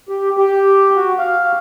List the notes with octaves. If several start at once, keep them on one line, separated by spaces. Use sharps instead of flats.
G4
G4
F#4
F5